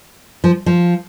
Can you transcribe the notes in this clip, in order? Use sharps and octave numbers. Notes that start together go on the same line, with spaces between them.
F3
F3